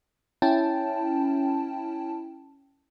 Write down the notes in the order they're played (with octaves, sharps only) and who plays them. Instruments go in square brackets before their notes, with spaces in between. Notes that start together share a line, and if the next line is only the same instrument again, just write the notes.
[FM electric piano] C#4 E4 G5 A5